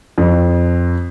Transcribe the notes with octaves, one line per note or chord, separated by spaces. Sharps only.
F2